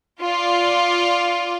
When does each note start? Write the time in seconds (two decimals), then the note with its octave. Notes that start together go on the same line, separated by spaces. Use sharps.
0.22 F4 D5